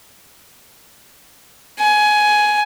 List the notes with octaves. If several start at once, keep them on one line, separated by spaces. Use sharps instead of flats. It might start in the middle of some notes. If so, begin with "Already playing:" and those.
G#5